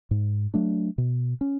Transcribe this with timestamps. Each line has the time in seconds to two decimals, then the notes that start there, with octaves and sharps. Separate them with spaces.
0.11 G#2
0.54 F#3 A3 D4
0.98 B2
1.41 C#4